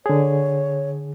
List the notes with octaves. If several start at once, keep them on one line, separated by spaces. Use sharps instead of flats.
D3 G#4 C#5